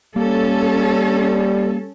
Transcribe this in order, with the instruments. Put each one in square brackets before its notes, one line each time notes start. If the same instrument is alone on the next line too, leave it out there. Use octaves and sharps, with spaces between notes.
[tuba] G3 [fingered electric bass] A#3 [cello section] C#4 A4